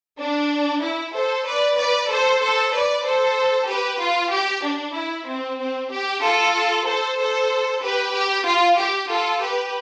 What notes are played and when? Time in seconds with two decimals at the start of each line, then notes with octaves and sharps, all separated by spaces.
0.19 D4
0.83 E4
1.14 A4 C5
1.46 B4 D5
1.77 B4 D5
2.10 A4 C5
2.42 A4 C5
2.74 B4 D5
3.05 A4 C5
3.69 G4 B4
4.01 F4
4.32 G4
4.65 D4
4.96 E4
5.28 C4
5.60 C4
5.93 G4
6.23 F4 A4
6.87 A4 C5
7.19 A4 C5
7.83 G4 B4
8.14 G4
8.47 F4
8.79 G4
9.10 F4 A4
9.42 G4 B4